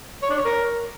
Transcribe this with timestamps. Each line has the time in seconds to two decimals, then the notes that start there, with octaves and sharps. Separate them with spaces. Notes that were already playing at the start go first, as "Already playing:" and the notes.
0.22 C#5
0.30 D4
0.37 C#5
0.45 A#4